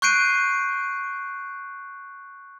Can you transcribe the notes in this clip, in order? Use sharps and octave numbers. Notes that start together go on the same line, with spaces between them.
C#6 F#6 G6 C7 D7 D#7